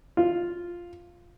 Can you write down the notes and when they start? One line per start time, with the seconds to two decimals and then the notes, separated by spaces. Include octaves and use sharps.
0.17 F4